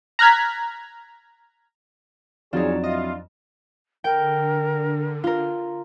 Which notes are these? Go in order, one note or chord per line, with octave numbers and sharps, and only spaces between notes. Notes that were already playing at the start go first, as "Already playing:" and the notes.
A#5 F6 F#6 G#6 B6
F2 F#3 D4 D#4 F4 G#4 C5 C#5
E4 F4 D#5
D3 A#4 G5
F4 A#4